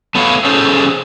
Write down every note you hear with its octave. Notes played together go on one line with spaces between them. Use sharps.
A3 B3 A4 C#5 D5 F5
C#4 G#4 A4 C5